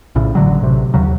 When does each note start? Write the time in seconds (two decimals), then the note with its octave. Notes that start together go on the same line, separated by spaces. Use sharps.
0.15 A#1 A2 C#3
0.35 A1 D3 F#3
0.61 A1 C3
0.94 D#2 C#3 F#3